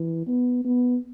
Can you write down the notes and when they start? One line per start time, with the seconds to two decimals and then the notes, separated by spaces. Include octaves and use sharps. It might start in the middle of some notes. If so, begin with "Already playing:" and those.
Already playing: E3
0.27 B3
0.64 B3